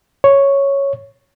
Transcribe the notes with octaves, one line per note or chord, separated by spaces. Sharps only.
C#5